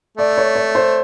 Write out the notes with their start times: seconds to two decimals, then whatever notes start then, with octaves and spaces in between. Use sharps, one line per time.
0.18 A3 D5
0.38 C#5
0.55 C#5
0.75 C5